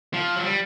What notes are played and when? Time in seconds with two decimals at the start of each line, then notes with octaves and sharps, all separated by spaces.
0.14 F3
0.36 F#3
0.43 G3